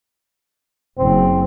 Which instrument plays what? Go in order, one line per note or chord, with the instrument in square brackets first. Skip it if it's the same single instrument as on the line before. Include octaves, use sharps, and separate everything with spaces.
[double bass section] F#1 [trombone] C4